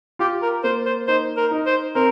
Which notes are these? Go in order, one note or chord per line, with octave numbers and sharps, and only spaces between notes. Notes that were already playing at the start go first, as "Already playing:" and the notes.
F4 G4
A#4
A#3 C5
C5
D#4 C5
A#4
D#4
C5
C4 A#4